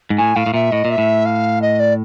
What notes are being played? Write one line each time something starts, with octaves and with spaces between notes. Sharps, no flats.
G#2
A2 G#5
A2 F5
A2
A#2 E5
A2 D#5
A#2
E5
A2
F5
D#5
D5